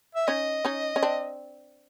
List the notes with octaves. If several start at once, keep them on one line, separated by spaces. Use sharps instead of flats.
E5
C#4 D#4 D#5
C#4 D#4
C#4
C4 D4